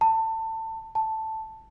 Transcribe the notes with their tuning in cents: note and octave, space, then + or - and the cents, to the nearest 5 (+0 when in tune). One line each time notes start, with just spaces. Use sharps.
A5 +25
A5 +5